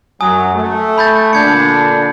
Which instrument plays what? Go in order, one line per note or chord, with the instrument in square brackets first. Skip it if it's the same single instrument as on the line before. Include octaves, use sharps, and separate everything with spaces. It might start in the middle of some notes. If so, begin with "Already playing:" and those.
[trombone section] F#2 F#3 [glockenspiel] G#5 D#6
[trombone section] A3
[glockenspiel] B5 G6 A6
[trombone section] A#2 D3 D4 [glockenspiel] G6 G#6 C#7